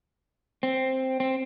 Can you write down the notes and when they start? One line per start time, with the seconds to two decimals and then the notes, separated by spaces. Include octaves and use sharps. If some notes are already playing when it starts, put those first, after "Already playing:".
0.63 C4
1.20 C4